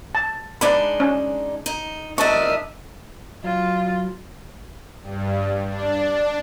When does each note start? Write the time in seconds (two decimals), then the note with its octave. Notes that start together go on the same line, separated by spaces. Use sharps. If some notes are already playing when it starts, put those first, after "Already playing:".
0.15 A5
0.61 G#3 D4 D#4 B4 D5 B5
1.00 C#4
1.66 D#4
2.18 D4 A#4 D#5 E5 A5 C#6
3.44 F#3 F4
5.02 G2
5.67 D4